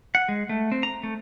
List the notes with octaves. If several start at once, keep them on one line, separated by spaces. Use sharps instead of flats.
F#5
G#3
A3
C4
A#5
A3